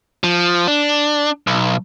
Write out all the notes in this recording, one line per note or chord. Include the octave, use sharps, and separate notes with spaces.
F3
D4
B1